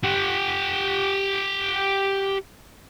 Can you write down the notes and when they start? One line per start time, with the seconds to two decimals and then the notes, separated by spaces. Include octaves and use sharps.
0.03 G4 F#5